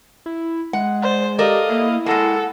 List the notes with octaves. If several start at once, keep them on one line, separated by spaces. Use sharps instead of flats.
E4
G#3 F#5
C5 D5
G4 A4 A#4 D5 D#5 F5
A#3 E4
G#3 A#3 A4 F#5